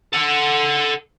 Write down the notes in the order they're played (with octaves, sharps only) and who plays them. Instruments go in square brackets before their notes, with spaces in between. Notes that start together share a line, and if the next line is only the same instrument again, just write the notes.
[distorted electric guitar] A4 F#5